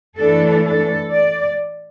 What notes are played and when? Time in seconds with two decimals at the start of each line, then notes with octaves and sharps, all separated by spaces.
0.18 A2 E3 A3 D4 A4
0.66 A4
1.12 D5